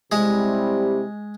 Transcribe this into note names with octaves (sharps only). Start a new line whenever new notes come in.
C3 G3 G#3 C4 E4 G4 G#4